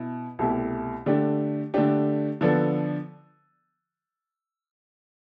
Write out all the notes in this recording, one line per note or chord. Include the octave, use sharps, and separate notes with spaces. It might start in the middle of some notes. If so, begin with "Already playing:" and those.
Already playing: B2 E4
C2 B2 A3 E4 G4
D3 A3 D4 G4
D3 A3 D4 G4
D3 F3 B3 D4 A4